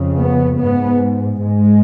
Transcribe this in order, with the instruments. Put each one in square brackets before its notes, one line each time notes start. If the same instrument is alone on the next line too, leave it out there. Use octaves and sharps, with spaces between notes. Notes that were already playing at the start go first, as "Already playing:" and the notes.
Already playing: [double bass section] F2 C#3
B3
G#2 B3
G#2 G#3